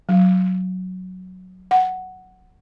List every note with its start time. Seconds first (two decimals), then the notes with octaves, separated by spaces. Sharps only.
0.09 F#3
1.71 F#5